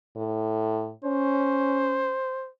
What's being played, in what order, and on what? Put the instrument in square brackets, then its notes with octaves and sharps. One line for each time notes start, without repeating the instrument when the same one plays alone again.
[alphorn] A2
[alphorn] C#4 [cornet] C5